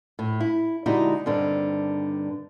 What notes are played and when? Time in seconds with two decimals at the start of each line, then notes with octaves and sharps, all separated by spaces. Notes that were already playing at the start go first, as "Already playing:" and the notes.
0.19 A2
0.40 E4
0.86 D3 G#3 D#4 E4 F#4 G4
1.26 G2 D3 D#3 C4